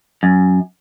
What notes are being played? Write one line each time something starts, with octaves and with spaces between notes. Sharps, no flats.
F#2